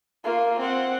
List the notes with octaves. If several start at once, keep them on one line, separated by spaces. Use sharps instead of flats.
A#3 F4
C4 F#5